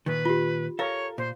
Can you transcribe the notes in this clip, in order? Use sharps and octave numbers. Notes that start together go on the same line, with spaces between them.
A#2 D#3 B4
F4 G4
A4 A#4 C#5 F5
A#2 C5